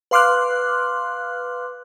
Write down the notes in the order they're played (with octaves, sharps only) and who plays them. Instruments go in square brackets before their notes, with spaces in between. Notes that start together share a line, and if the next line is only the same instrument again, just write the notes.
[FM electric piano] B4 F5 C6 D6 F6 F#6